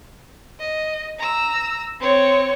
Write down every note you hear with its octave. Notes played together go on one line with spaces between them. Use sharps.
D#5
A#5 E6
C4 C#5